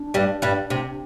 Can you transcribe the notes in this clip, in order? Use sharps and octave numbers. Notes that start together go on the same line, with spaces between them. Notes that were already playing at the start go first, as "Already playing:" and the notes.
Already playing: D4
G2 G3
G2 G3
C3